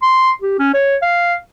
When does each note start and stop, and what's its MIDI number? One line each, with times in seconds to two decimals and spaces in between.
0.03 0.31 84
0.42 0.55 67
0.59 0.73 61
0.74 0.96 73
1.02 1.35 77